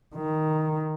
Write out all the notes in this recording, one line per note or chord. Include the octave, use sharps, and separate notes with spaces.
D#3